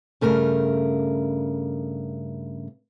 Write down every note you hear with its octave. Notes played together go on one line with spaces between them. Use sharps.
G2 C#3 A3 A#4